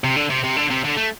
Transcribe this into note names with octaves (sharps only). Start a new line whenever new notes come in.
C3
D3
C3
C3
D3
C3
D3
A3